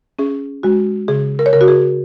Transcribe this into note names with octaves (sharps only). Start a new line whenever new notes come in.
C#4 G#4
G#3 F#4
C#3 G#4
A#4
C#5
C#3 A#4
F#4
G#4